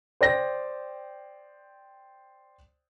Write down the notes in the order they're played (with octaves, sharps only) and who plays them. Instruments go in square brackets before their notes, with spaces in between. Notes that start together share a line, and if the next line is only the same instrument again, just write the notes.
[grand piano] C5 D5 G5 A#6